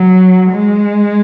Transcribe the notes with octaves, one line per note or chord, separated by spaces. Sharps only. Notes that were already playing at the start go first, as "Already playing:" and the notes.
Already playing: F#3
G#3